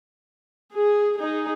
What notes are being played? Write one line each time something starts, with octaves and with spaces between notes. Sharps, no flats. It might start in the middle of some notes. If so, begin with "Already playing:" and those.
G#4
D#4 G#4